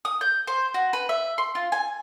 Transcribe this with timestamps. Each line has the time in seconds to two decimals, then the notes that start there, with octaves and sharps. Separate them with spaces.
0.05 D#6
0.21 G6
0.47 C5
0.74 F#4
0.93 B4
1.09 E5
1.38 C6
1.55 F4
1.72 G#5